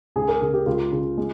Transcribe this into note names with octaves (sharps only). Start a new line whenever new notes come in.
C#2 G#4
A#4
C#3 G#4
G4
C#2 F4
C#3
G#3